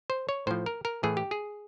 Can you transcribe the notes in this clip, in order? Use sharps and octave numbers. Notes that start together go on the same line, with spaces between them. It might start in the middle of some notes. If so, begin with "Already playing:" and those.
C5
C#5
A2 F3 C5
A#4
A#4
A2 E3 G#4
G4
G#4